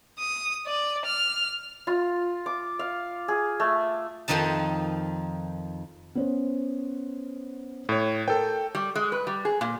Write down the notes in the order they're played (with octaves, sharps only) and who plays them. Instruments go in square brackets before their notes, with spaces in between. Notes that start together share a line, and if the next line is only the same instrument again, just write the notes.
[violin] D#6
D5
F6
[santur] F4
D6
F5
G#4
A3
[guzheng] F2 D#3 F3 D#4 A5
[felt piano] B3 C#4 C5
[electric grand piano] A2 C#5
[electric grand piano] A4 G5 [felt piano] A#4
[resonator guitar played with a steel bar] G3
G#3
B4
G3
G#4
A#2